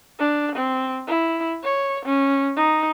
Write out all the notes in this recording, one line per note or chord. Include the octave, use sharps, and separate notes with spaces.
D4
C4
E4
C#5
C#4
D#4